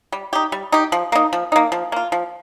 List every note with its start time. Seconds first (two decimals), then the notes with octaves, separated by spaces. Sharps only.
0.12 G3
0.33 D#4 G4
0.52 G3
0.72 D#4 G4
0.92 F3
1.12 A#3 D#4
1.33 F3
1.52 A#3 D#4
1.72 F3
1.92 A#3 F4
2.12 F3